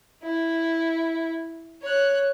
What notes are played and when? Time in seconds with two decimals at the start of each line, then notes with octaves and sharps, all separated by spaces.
0.23 E4
1.82 C#5 F#6